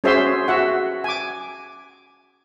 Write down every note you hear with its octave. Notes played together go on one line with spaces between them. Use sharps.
C#4 F#4 G#4 C5 E5 C6
F#4 E5 F#5
G#5 D6